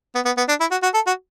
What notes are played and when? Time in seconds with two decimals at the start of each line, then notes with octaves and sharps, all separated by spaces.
0.15 B3
0.25 B3
0.37 B3
0.48 D4
0.60 E4
0.71 F#4
0.83 F#4
0.94 A4
1.07 F#4